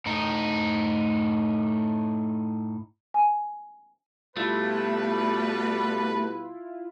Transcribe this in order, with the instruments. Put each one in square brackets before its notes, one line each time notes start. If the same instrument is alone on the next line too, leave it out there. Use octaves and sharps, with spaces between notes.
[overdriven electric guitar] A2 D#4
[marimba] G#5
[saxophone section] B2 G3 [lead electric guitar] A3 [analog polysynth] E4 F4 [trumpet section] B4